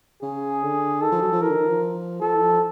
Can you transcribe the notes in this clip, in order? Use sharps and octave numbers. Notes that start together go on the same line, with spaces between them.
C#3 G#4
D3
D#3 A4
F3
F#3
F3
E3 A#4
D3
D#3
F3
F3 A4
E3
F3